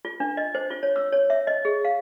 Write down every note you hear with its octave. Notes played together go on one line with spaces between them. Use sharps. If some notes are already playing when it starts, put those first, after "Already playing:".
F4
D4
D#5
C5
F4
C#5
E6
C#5
E5
D#5
G#4
F5